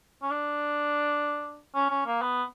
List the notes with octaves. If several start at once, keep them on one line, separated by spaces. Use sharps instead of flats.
C#4
D4
C#4
C#4
A#3
B3